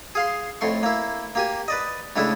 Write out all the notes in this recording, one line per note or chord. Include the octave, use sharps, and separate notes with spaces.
G#4 F5 C6
F2 A2 C6 C#6
A#3 E4
A#3 G4 G#5
B4 D5 D#5
A2 C#3 G#3 D4 E4